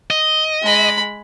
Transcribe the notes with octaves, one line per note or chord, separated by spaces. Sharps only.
D#5
G#3 B5